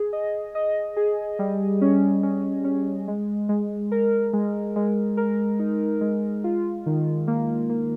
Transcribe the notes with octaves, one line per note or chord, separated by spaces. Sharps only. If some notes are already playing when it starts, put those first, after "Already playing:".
Already playing: G#4
D#5
D#5
G#4
G3
C#4
C#4
C#4
G#3
G#3
A#4
G#3
G#3
A#4
D#4
G#3
F4
D#3
A#3
A#3